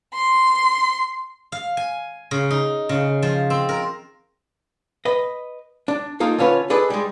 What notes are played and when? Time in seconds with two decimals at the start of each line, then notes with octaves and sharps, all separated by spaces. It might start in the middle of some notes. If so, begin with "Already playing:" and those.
0.14 C6
1.52 F5
1.77 G#5
2.31 C#3
2.51 D#4
2.89 C#3
3.22 F3
3.50 C4
3.69 A#4
5.05 B4 D#5
5.88 D4
6.20 A#3 D#4 F4 A4
6.38 D3 C#4 F4 B4 C#5
6.70 D4 G#4 A4 B4 D#5
6.90 G3 G#3